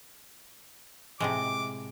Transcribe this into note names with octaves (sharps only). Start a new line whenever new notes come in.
A2 C3 G#3 D6